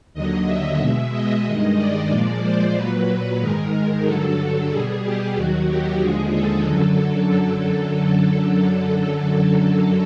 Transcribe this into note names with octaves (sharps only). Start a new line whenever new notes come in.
D#2 D3 F#3 D#5
E5
B2 G#3
D#5
G2 D#3 G#3
D5
A#2 F3 G#3 D5
C5
A#2 F#3 B4
G#2 D#3 G#3 A#4
G2 D3 F#3 A4
B2 G3 G#4
G4
D#2 D#3 F#3 F#4
G4
D#2 D3 F3 G#3 G#4
A4
F#2 D3 F#3